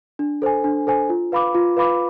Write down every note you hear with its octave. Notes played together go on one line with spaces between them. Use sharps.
D4
A4 C5 G#5
D4
A4 C5 G#5
F4
B4 F5 B5 D6
F4
B4 F5 B5 D6